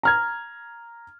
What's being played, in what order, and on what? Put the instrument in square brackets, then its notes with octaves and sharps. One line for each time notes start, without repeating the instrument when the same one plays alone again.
[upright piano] A#5 F6 G#6